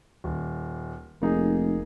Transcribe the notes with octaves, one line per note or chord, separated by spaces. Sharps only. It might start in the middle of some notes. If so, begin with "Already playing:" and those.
D#1
F1 A#3 D#4 G#4